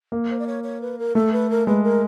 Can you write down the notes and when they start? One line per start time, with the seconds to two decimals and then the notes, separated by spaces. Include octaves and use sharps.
0.12 A#3
0.30 C5
0.39 D5
0.47 C#5
0.64 C#5
0.81 B4
0.99 A#4
1.15 A3 A4
1.33 B4
1.50 A#4
1.67 G#3 B4
1.84 A#4